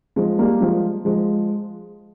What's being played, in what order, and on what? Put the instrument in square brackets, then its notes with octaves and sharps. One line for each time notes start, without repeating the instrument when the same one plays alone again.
[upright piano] F3 G#3
G3 A#3
F3 G#3
F3 G#3